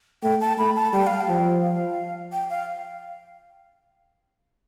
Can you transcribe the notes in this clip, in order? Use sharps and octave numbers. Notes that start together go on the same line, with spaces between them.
A3 G5
A5
A3 B5
A5
G3 G5
F5
G5
F3
F5
G5
F5